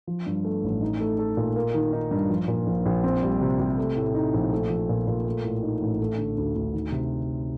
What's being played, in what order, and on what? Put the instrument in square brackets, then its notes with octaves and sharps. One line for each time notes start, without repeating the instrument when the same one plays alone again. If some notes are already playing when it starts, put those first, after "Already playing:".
[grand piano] F3
G2
A3
A1
D#4
A3
A4
A#2
A#3
D#3
D#4
G2
F3
A#2
A#1
A#1
C4
G3
C3
C3
A3
A2
D#4
A#1
A3
F3
A#2
A#2
A3
A2
D#4
A1
A3
D3
D2
D2
D#3
C3